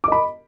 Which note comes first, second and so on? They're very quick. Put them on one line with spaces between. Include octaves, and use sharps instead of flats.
D6 D#5 B5